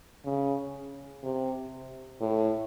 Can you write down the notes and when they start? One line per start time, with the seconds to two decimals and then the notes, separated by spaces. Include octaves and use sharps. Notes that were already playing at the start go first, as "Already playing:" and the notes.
0.25 C#3
1.23 C3
2.21 A2